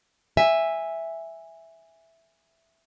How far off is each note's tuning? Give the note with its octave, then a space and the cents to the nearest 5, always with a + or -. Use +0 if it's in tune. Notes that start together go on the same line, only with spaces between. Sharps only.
E5 +0 G#5 -15